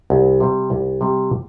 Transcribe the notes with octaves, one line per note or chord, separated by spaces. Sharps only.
C2
C3 G3
C2
C3 G3